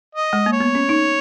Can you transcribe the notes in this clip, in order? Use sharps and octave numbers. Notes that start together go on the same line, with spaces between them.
D#5
G#3
A#3
C#5
B3
C#4
D#4